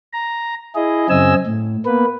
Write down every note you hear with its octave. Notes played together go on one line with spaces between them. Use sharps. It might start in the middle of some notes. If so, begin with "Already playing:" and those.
A#5
E4 G#4 D#5
F#2 C#3 C4 D#5 G#5 E6
A2
A#3 B3 B4